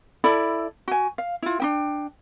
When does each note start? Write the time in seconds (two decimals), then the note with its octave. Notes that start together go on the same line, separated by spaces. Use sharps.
0.24 E4 A4 D5 B5
0.88 F#4 G#5
1.18 F5
1.42 E4 F4
1.60 D4 D#4 G5